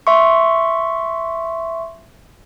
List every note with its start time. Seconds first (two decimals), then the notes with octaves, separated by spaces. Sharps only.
0.07 E5 C6 C#6